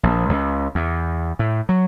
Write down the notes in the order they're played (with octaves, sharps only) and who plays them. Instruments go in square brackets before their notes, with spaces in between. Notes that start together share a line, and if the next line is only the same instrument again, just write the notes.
[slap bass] A#1
C#2
E2
A2
F#3